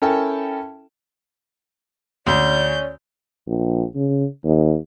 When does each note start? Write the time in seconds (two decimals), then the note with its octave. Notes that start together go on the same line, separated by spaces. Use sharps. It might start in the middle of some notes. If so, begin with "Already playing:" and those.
0.02 C#4 E4 A4 A#4 G5 A5
2.27 D2 C#4 D5 G6
3.47 A#1
3.95 C#3
4.44 D#2